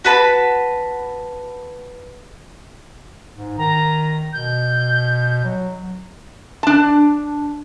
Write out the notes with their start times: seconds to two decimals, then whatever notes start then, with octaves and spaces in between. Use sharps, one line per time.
0.05 F#4 B4 A5 B5
3.36 G#2
3.58 D#3 A#5
4.33 B2 G6
5.44 F#3
6.63 D4 A5